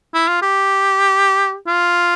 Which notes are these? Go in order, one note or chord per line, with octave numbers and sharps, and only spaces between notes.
E4
F4
G4
F4